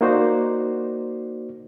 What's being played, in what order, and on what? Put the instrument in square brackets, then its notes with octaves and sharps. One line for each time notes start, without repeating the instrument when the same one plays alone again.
[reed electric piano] A#3 D#4 F#4 C5 D5